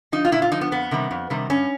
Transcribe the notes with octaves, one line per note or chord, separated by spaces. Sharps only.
F3 D#4
F4
A#2 E4
F4
F3 D#4
B3
F2 B3
C3 D#3 G3
F2
C3 D#3 G3
G2 C#4